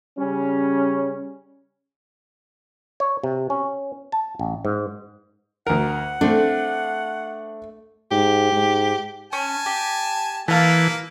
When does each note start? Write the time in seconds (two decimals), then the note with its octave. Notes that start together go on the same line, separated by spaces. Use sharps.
0.19 C#3 G3 C#4
3.00 C#5
3.23 C3
3.50 C#4
4.12 A5
4.39 A1
4.65 G#2
5.67 D2 A#4 F#5
6.21 A3 C4 D4
8.11 G#2 G4
8.52 G#2
9.33 C#4 G#5 A5
9.66 G4
10.48 E3 A#3 F5 A5